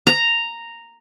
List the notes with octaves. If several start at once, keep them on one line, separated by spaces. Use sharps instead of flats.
A#5